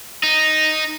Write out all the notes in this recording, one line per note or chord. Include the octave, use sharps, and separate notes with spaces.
D#4